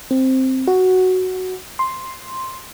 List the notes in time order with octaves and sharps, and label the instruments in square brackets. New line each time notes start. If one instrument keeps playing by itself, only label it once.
[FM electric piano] C4
F#4
C6